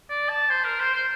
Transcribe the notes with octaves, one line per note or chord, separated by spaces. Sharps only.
D5
A5
C5
A#4
C5
C5